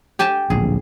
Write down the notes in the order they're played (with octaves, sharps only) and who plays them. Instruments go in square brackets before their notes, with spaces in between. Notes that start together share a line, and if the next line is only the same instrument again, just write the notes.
[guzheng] G4 G#5 A5
[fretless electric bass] D1 A#1 [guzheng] G#4